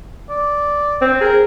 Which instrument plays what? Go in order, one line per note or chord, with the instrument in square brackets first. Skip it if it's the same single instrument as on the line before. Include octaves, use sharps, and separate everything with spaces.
[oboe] D5
[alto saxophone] C4
[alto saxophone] G#4 [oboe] A#4